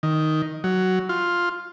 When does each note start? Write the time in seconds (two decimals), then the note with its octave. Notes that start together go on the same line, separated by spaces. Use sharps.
0.03 D#3
0.64 F#3
1.09 F4